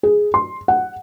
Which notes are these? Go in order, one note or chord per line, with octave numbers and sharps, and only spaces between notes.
G#4
C6
F#5